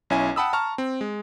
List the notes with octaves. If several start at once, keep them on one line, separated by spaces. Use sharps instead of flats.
B1 C#4 E4 G#5
F#5 G5 A5 B5 D#6 E6
A5 A#5 C#6 F6
C4
G#3